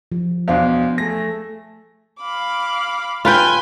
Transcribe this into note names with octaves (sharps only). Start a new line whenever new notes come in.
F3
E2 B2 D4 C5 F5
A3 G#4 A#6
F5 B5 D6
F4 B4 G5 G#5 G6